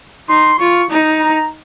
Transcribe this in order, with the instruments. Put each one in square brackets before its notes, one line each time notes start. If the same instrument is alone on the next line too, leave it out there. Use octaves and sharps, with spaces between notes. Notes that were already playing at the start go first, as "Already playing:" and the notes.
[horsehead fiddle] D#4 [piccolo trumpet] C6
[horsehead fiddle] F4 [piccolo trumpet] C#6
[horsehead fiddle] D#4
[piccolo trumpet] A#5